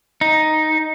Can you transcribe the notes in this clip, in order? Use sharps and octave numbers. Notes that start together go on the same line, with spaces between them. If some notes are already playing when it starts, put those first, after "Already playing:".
D#4